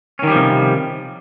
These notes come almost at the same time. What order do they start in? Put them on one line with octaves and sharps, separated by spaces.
C#4 D#3 G3 F3 C3